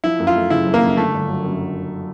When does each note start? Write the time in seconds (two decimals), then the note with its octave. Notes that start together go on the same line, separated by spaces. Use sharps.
0.04 F3 E4
0.20 F#2
0.27 F4
0.35 A3
0.50 C#3 E4
0.66 F3
0.74 A#3
0.82 F#2
0.97 D3 A3
1.14 G1
1.29 F#3
1.44 F#2